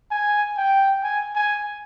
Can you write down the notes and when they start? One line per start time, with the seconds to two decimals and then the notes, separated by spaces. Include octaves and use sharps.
0.11 G#5
0.57 G5
1.04 G#5
1.35 G#5